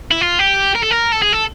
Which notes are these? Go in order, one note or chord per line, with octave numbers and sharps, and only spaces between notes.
E4
F4
G4
A#4
A4
A#4
A4
G#4
A4